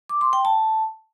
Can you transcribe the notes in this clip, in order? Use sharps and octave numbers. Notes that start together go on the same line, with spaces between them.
D6
C6
G5
A5